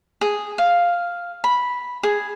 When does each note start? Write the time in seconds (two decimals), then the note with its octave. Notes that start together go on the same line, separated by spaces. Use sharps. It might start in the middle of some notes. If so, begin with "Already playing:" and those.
0.21 G#4
0.58 F5
1.44 B5
2.03 G#4